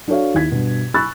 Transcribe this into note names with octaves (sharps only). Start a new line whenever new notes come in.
D4 F#4 A4 C#5 F5
D#2 E4 G#6 B6
G2 B2
G#5 B5 C#6 E6 F#6 A6